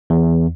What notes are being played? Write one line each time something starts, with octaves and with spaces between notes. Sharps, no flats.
E2